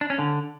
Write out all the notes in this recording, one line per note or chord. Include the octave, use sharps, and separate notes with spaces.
D4
C#4
D3